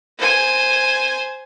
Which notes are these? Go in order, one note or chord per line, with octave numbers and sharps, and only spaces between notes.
C5 G#5